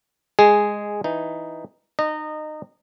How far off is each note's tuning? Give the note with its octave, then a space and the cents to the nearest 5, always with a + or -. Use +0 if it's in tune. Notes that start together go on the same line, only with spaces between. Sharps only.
G#3 -5 G#4 +0
E3 +0 D#4 +0
D#4 -25 D#5 -20